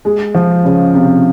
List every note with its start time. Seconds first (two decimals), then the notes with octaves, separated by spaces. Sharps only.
0.05 G#3
0.34 F3
0.64 C#3
0.94 C3